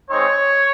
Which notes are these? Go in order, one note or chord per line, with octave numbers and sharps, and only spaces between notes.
G#3 C4 D#4 C#5